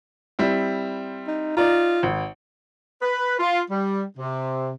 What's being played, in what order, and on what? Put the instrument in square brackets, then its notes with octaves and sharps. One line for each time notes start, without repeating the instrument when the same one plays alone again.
[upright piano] G3 C4 E4
[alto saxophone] D#4
[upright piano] D#4 D5 A#5 [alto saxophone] F4
[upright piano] G#1
[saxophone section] B4
F4
G3
C3